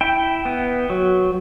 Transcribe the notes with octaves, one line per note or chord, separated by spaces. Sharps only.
E4 G5
B3
F#3